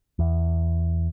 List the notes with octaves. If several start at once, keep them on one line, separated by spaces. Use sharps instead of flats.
E2